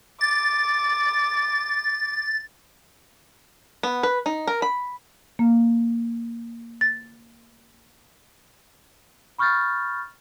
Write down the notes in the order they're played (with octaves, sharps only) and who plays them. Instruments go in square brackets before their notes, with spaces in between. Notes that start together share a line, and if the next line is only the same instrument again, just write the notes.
[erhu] D6 [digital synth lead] A6
[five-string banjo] B3
B4
D#4
A#4
B5
[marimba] A#3
A6
[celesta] B5 C#6 F6 G6 A6